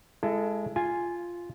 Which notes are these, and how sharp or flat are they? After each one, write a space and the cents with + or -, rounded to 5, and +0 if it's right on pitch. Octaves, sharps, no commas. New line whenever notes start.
G#3 +0 E4 +40 A4 +0
F4 -5 G#5 +0